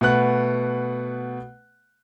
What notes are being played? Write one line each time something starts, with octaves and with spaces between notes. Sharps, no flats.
B2 A3 B3 B4 F#5 F#6